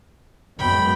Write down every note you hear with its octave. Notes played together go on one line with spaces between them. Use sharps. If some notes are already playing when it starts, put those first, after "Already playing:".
F#2 G#3 B3 G5 B5